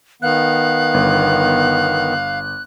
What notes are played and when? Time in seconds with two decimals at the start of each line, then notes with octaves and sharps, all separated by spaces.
0.22 D#3 B3 F5 F#6
0.94 G1